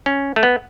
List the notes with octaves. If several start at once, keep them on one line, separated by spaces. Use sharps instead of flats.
C#4
A3
B3